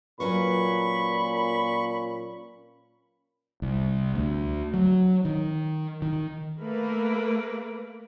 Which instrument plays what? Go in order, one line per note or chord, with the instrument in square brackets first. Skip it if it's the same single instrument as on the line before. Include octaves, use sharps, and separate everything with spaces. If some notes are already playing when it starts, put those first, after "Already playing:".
[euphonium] A#2 [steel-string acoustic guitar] F#3 C#4 B4 [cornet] B5 [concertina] C#6
[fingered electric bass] C2
D2
F#3
D#3
D#3
[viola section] A3 A#3 A#4 B4